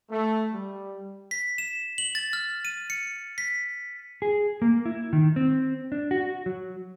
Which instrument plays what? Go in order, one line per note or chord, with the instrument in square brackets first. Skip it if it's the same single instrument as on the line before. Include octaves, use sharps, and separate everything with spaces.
[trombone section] A3
G3
[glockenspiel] B6
E7
F#7
A6
F6
D#7
C#7
B6
[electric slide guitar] G#4
A#3
E4
D#3
C4
D4
F#4
F#3